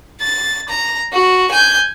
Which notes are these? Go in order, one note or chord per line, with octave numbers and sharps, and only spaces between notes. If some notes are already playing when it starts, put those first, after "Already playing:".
A6
A#5
F#4
G#5 G6